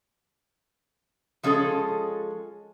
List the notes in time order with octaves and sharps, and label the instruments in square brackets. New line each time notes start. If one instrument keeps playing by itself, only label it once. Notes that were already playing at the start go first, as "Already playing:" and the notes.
[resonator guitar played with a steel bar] F3 G#3 C#4 G#4 A4